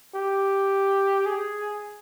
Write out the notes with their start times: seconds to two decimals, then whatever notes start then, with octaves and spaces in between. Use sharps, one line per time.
0.15 G4
1.26 G#4